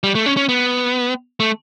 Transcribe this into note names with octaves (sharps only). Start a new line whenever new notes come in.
G3
A3
C#4
C#4
B3
A3